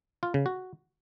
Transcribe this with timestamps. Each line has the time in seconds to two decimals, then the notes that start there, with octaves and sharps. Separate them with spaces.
0.23 F4
0.34 C#3
0.46 F#4